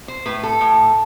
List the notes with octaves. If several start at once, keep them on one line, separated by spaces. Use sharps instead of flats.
C5
A2 B4
A4
A2